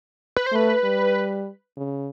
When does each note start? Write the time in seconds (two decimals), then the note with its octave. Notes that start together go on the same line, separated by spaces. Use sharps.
0.37 B4
0.46 C5
0.52 A3 B4
0.84 G3
1.77 C#3